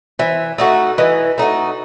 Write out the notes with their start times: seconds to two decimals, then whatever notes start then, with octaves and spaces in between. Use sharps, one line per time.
0.19 E3 C5 E5
0.58 A3 D#4 F#4
0.98 E3 B4 D#5
1.38 A3 D#4 F#4